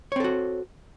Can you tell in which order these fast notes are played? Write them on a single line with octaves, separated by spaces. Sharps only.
C#5 C4 A4 F#4